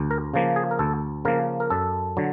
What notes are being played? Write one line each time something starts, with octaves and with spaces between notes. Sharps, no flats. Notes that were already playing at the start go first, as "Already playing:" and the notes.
Already playing: D2
A#4
C#3 F3 A#3
G#4
A#4
D2 A4
C#3 F3 A#3 A#4
A#4
F#2 A4
D3 F#3